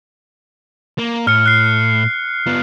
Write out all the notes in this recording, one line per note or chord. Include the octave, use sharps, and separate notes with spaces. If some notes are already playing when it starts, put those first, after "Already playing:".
A#3
A2 F6 C#7
F#6 C7
B3 F4